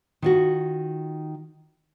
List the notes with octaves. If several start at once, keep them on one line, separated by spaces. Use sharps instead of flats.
D#3 F4 F#4